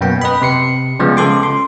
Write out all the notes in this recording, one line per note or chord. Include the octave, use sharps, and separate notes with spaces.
F#2 B2 A#3 B3 G5
B4 D#5 B5
C3 C7 C#7
C#3 F3 G3 G#3 B3
C#3 G#3 A4 C6 D6
C6